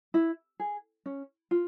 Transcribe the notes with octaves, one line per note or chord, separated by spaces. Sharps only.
E4
G#4
C#4
F4